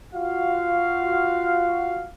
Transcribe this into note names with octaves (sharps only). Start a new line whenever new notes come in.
F4 F#4 F5